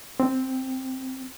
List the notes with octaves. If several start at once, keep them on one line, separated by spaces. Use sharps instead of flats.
C4